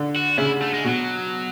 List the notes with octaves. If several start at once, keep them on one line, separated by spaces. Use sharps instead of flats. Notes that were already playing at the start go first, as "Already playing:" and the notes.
Already playing: D3
F#4
C#3 E4
A3
G#3
B2 F#3